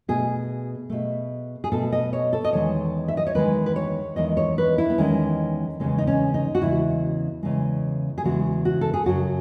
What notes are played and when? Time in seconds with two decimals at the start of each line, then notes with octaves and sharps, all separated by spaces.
0.08 B2 A3 G#4
0.90 B2 A3
1.64 G#4
1.72 B2 A3 A4
1.92 D#5
2.13 C#5
2.33 A4
2.44 D#5
2.53 E2 D#3 G#3 C#5
3.08 E5
3.17 D#5
3.27 C#5
3.35 E2 D#3 G#3 B4
3.66 B4
3.76 C#5
4.16 E2 D#3 G#3 D#5
4.37 C#5
4.58 B4
4.78 E4
4.90 B3
4.98 E2 D#3 G#3 C#4
5.80 E2 C#3 G#3 C#4
5.98 D#4
6.07 C#4
6.34 D#4
6.55 F#4
6.61 E2 C#3 G#3 E4
7.43 E2 C#3 G#3
8.18 G#4
8.24 E2 C#3 G#3 F#4
8.65 F#4
8.81 A4
8.94 G#4
9.06 F#2 C#3 F#3 F#4